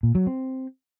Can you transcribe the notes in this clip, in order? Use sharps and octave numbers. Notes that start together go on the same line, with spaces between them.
A#2
F#3
C4